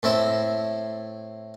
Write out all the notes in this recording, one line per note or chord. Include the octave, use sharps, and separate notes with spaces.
A2 C4 E4